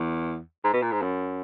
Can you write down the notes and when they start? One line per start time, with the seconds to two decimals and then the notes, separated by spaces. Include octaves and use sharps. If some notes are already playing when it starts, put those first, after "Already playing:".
Already playing: E2
0.64 G#2
0.73 B2
0.82 A#2
0.92 G#2
1.02 F#2